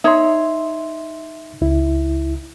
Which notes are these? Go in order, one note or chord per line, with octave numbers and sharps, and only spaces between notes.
D#4 C#5 E5 C6
C#2 E4